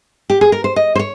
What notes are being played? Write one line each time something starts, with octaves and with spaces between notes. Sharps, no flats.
G4
G#4
A#4
C5
D#5
C5
C#5